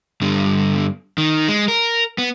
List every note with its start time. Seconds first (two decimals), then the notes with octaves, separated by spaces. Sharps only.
0.21 G2 D3
1.18 D#3
1.48 G#3
1.68 A#4
2.18 B3